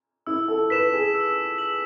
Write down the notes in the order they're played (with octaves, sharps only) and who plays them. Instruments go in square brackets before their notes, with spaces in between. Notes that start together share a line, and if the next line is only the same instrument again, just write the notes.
[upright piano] E4 [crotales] E6
[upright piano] A4
[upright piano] B4 [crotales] B6 E7
[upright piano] G#4
[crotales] E6
B6 F#7